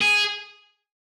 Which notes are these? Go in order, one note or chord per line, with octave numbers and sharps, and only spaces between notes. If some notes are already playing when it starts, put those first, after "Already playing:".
G#4